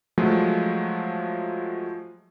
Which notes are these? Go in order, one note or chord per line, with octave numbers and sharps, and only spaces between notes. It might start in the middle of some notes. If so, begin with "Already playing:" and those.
F3 F#3 G#3 A3 F4